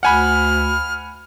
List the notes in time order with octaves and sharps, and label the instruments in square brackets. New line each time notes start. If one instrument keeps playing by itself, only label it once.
[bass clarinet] D2 [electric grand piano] F#5 G#5 B5 [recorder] F6